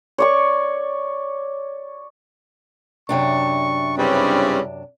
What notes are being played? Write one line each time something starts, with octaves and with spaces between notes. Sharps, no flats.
C#5 D5 C#6
F#2 C3 D4 C#6
G2 C#3 G3 C4 C#4 E4 B4